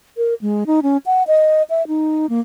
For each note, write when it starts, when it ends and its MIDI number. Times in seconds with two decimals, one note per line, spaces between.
0.17 0.34 70
0.41 0.64 56
0.67 0.80 63
0.83 0.97 61
1.06 1.23 78
1.27 1.63 75
1.70 1.86 76
1.88 2.26 63
2.29 2.40 58